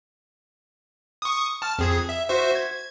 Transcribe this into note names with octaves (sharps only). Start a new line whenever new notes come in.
C#6 D#6
A5 F6
F2 G#4 G#6
E5
F#4 C5 E5
G#6